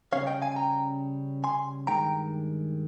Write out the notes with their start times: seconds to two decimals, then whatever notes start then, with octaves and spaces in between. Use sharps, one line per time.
0.12 C#3 G3 C#4 C#5 F5
0.27 D#5 G5
0.42 F5 G#5
0.52 G#5
0.56 G5 A#5
1.44 G#5 C6
1.87 G2 D#3 G#3 G5 A#5